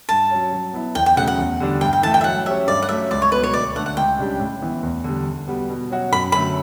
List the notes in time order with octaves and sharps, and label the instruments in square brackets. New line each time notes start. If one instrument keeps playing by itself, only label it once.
[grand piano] G2 [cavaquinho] A5
[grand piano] F#3 C#4
F#3
B3 E4
[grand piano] E2 [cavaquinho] G5
[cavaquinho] G5
[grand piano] C#3 F#3 A3 [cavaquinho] F#5
[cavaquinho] F#5
[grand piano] E2
D3 G3 D4
[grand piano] G2 [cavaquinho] G5
[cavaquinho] G5
[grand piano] E3 A3 [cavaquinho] A5
[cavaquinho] G5
E5
[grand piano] F#3 [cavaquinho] F#5
[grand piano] C#4 G4 C#5 [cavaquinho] E5
[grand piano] G2 [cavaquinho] D5
[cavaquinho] F#5
[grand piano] F#3 A3 C#4 [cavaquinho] E5
[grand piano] C#2 [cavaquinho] D5
[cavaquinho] C#5
[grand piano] B2 F#3 [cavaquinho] B4
[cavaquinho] C#5
[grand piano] D2 [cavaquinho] D5
[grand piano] D3 A3 D4 A4 [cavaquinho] F#5
[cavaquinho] F#5
[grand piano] C#2 [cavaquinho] G5
[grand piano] C#3 G3 D4 G4
A2
E3 B3
E2
D3 G3
D3
G3 B3 F#4
B2
F#3 C#4 F#4
[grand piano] F#2 [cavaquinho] B5
[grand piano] D3 F#3 A3 [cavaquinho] B5